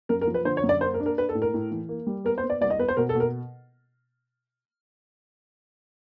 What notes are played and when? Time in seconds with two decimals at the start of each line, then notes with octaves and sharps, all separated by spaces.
0.09 F#2 A#4
0.21 A#4
0.27 F3
0.34 B4
0.45 D3 C5
0.57 C#5
0.63 F#2
0.69 D5
0.81 A#3 C5
0.94 A#4
1.00 D4
1.06 A#4
1.18 D4 B4
1.29 A4
1.35 A2
1.42 A#4
1.54 A2
1.71 E3
1.89 A#3
2.07 G3
2.24 B3 A#4
2.38 C5
2.43 B3
2.50 D5
2.61 C2 D5
2.70 D#5
2.79 B3 B4
2.88 C5
2.97 B2 A#4
3.09 A4
3.15 B2
3.20 A#4